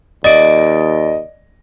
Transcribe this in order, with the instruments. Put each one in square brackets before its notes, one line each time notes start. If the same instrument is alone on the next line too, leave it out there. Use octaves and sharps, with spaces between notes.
[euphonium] D#2 [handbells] D5 D7 [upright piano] D#5